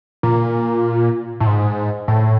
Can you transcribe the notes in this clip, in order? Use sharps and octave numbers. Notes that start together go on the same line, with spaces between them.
A#2
A2
G#2
A2